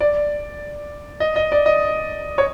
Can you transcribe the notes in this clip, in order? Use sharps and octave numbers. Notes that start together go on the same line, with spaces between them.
D5
D#5
D#5
D5
D#5
C#5